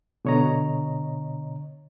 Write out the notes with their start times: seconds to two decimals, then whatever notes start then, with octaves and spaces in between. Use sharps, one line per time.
0.25 B2 D3 C#5 D#5 A#5